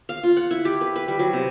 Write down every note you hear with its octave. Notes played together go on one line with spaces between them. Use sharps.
F5
F4
F#5
E4
G4
B4
B4
G3
F#3
C3